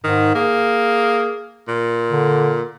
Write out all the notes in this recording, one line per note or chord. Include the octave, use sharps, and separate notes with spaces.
G#2 D#3
A#3 G#4
A#2
D3